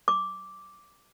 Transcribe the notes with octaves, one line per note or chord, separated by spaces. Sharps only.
D6